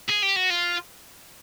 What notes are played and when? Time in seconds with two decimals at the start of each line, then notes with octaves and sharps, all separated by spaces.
0.09 G#4
0.22 G4
0.36 F#4
0.50 F4